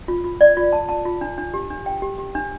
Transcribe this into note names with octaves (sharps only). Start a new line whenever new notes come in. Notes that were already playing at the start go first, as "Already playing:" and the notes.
F4
F4
D5
F4
A5
A5
F4
D4
D4
G4
D4
G5
G4
G4
D4